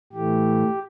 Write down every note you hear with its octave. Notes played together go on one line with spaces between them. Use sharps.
A2 E3 A3 G4